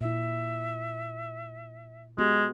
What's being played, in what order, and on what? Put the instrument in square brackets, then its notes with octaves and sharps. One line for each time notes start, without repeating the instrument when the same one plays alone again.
[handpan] A#2 E4 [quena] E5
[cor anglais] G#3 [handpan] B3 F#4 G4